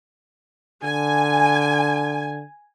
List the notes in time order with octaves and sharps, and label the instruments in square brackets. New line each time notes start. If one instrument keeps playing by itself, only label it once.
[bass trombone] D3 [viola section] G#5